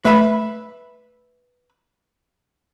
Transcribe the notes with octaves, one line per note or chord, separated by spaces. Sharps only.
A3 B4 E5 B5